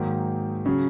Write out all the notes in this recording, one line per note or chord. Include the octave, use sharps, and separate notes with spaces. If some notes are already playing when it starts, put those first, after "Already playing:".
Already playing: G#2 D#3 F#3 A#3
C#3 F#3 C#4